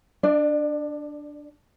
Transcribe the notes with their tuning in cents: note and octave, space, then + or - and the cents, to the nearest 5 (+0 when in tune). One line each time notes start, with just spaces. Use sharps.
D4 +0 D5 +30